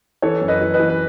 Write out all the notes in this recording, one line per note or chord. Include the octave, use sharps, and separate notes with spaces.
E3 A4 C#5
F#2
B4 D#5
E3
B4 D#5
E3
B4